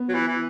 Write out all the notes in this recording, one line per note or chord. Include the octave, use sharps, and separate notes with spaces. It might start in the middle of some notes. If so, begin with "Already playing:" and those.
Already playing: B3
F#3
E3
E3